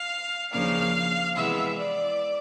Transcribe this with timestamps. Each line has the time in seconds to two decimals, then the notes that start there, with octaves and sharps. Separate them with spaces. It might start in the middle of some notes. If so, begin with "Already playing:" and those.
Already playing: F5
0.51 D#2 C#3 F3 A#3 D4 F5
1.35 C3 E3 G#3 B3 E5
1.77 D5